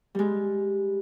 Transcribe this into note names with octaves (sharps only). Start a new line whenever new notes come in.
G3 G#3